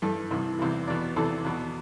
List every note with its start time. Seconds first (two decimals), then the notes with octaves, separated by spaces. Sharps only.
0.02 G2 E3 A4
0.31 C2 C3 E3
0.59 E2 C3 E3
0.87 E2 B2 D5
1.16 E2 C3 E3 A4
1.44 E2 B2